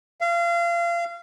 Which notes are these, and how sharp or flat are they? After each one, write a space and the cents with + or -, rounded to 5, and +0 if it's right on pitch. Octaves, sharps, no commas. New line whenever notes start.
F5 -30